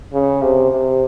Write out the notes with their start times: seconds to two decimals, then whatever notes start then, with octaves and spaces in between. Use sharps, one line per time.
0.13 C#3
0.42 C3
0.71 C3